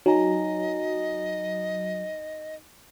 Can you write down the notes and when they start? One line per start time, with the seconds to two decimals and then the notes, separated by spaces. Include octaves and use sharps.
0.06 F#3 D#4 D#5 G#5 A#5